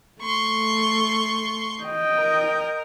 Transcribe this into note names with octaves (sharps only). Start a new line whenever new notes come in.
A3 C6 C#6
D#5 G5
A#4